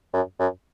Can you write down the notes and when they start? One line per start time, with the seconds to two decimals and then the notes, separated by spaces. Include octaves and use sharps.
0.13 F#2
0.39 F#2